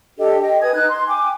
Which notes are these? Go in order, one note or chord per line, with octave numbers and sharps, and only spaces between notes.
D4 G4 A4 D#5
D#5 G5
B4 G#5 D#6 G#6
D#4 F#6
C6
G5 G#5 D6